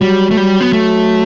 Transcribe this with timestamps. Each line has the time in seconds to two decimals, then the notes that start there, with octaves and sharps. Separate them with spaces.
0.01 F#3 G3
0.31 A3
0.37 G3
0.61 B3
0.73 A3